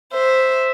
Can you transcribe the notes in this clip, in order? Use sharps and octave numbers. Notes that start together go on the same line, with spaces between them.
C5 E5